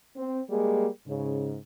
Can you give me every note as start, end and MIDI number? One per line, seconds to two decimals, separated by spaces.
0.16 0.40 60
0.49 0.86 55
0.49 0.86 56
0.49 0.86 58
0.49 0.86 68
1.07 1.56 44
1.07 1.56 49